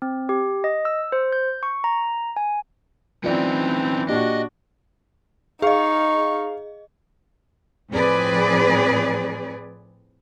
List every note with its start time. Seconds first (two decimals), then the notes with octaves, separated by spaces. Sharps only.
0.02 C4
0.29 G4
0.64 D#5
0.85 E6
1.12 C5
1.32 G6
1.63 C#6
1.84 A#5
2.36 G#5
3.24 E3 F#3 C4 C#4 D#4 F4 D5
4.09 A#2 D4 F#4 G4 D#5
5.62 D#4 G#4 D#5 F5 C#6
7.91 A2 F3 C4 G#4 B4 D5